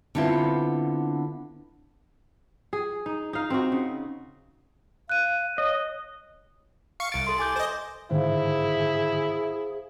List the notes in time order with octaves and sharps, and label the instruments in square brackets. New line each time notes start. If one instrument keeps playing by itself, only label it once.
[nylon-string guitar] D3 B3 C4 E4 F4
[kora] G#4
D#4
D#4 F5
C4 D#4 F#4
C#3
[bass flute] F5 [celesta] F#6 D#7
[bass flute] C#5 [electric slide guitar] D#5
[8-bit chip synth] F5 C#6 C#7
[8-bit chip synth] C2 A6 [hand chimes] D7
[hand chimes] A4 C6
G#5 D6 G6
[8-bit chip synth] C5 D#5
[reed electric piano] G#2 D3 D#3 [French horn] E4 [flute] G#4 [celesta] C5 F5